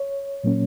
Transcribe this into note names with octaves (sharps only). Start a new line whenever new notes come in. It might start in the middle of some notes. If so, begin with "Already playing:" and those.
Already playing: C#5
A#2 F#3 A#3 C#4